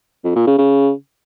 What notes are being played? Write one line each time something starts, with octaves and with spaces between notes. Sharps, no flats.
F2
A#2
C#3
C#3